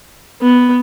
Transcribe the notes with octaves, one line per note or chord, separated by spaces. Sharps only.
B3